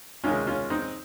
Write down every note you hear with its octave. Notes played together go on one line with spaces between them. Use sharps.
C#2 C3 D#3 G#3 C#4 F4
C#4 F4
C4 D#4